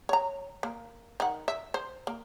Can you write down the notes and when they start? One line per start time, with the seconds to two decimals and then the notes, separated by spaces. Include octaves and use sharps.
0.09 C#5 A#5
0.63 A#3
1.20 D#3 F#5
1.48 E5
1.74 C5
2.07 A#3